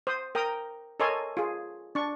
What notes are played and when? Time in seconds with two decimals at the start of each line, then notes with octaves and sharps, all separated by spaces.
0.07 C5 D#6
0.35 A#4 G5 A#5 D#6
1.00 A4 A#4 C#5 D#5 G#5 C6
1.37 F4 G#4
1.95 D4 C#6